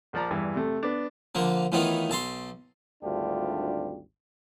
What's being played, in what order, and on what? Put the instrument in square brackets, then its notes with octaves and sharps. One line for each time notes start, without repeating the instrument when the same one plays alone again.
[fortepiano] A#1 F3 D5 A#5
E2 G2 E3
C3 A3
B3 D4
[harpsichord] D3 F3 A#3
A2 D#3 E3 B3 D#4 F4
B1 A5 A#5 C6
[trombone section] G#1 D2 G3 D4 F4 G4